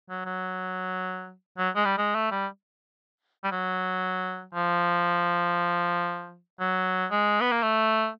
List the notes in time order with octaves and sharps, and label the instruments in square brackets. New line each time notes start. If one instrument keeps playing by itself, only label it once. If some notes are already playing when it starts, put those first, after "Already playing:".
[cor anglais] F#3
F#3
F#3
G#3
G3
G#3
A3
G3
G3
F#3
F3
F#3
G#3
B3
A#3
A3